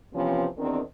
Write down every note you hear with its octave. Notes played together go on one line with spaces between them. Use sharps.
C3 E3 F3 B3 C#4
E2 D#3 C4 D4 A#4